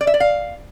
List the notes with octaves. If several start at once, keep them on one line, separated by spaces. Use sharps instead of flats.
D5
E5
D5
F5